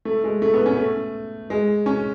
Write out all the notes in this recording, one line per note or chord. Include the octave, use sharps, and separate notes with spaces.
A3
G#3
A3
B3
C#4
A3
G#3
C#4